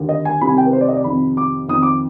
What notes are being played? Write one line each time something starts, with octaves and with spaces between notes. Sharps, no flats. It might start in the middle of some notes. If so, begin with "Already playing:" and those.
Already playing: D#2 D3
D#5
G#5
C2 C3 D#3 B5
G#5
G5
B4
C5
D5
D#5
D5
F2 C3 D#3 B5
D6
F2 D#3 D#6
D6